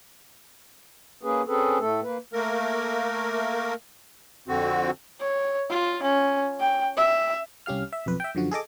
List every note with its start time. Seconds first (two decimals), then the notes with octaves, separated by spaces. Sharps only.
1.23 A#3 C#4 G#4 B4
1.47 C4 C#4 G#4 A4 B4
1.79 A2 A3 A4
2.03 A#3 B4
2.33 A3 A#3 A#4
4.48 F2 D3 C4 F#4
5.20 C#5
5.70 F4
6.03 C#4
6.60 G5
6.97 E5
7.66 C2 C#4 G4 F5 F6
7.93 E5
8.06 B1 F2 B4
8.20 E5 G5
8.35 F#2 D3 F3 F#4
8.51 G#4 A4 D#5 D6